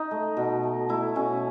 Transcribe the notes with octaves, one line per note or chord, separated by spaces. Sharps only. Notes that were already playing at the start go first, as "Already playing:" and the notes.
Already playing: D#4
A3
B2
A3
A3 E4
B2 C#4